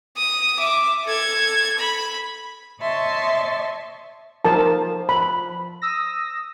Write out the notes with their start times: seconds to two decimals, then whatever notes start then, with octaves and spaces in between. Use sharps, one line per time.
0.17 D#6
0.59 E5 D6
1.04 A4 G#6
1.79 B5
2.81 C#5 D#5 E5 A5 C6 C#6
4.45 F3 A#4 A5
5.09 B5
5.82 D#6 E6 A#6